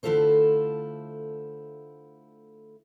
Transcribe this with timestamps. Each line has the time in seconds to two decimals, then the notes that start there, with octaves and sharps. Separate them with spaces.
0.03 D3 A3 E4 F4 A4 C5